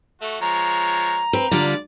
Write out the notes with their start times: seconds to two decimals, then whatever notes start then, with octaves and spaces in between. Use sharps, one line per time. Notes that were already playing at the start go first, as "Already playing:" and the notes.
0.21 A3 F#4
0.41 F3 G#3 C#5 A#5
1.33 C4 B4
1.51 D3 G3 F4 D5